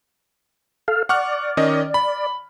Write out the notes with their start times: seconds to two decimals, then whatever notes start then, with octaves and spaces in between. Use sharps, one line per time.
0.88 A4 F5
1.09 D5 F#5 C#6 F6
1.57 D#3 C#4 D#5
1.94 B5